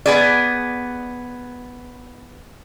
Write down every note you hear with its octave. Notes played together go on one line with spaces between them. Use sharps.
B3 G#4 D5